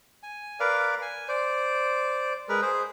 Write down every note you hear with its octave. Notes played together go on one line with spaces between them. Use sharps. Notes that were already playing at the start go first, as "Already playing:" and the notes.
G#5
A#4 B4 D5 F5
G#5
C5 D5
G#3 A#4 B4
G#4 C5